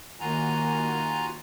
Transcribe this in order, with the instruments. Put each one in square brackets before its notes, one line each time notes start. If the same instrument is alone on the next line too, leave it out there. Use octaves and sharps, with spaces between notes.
[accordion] D#2 F#4 G#5 [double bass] D#3 A#3 [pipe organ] F4 A#5